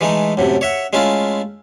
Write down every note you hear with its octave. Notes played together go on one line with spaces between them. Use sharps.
E3 G#3 A3 D#4
F#2 A2 C3
C#5 E5 F#5
G#3 A3 C#4 E4 F4